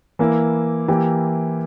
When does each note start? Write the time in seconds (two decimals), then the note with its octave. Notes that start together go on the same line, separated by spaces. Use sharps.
0.19 E3 A#3 E4
0.88 E3 A#3 E4 G4